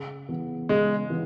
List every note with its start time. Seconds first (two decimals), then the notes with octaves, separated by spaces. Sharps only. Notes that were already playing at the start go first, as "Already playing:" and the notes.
Already playing: C#3
0.29 E3 B3
0.69 C#3 G#3
1.10 E3 B3